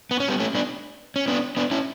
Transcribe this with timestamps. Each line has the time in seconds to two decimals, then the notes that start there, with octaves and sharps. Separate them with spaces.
0.11 B3
0.20 C#4
0.28 G3 B3
0.40 A3 C#4
0.55 B3 D4
1.16 C#4
1.28 B3 D4
1.57 B3 D4
1.71 C#4 E4